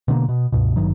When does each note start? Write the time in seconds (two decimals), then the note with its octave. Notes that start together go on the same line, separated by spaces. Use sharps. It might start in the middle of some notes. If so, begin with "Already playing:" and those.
0.08 B2 D3 G3 A#3
0.28 B2
0.52 C#2 G2 B2
0.76 G#1 G2 D#3 F#3